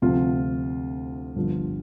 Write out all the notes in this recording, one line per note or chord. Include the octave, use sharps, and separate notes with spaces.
D2 C3 F3 F4
G1 G2 D3 F3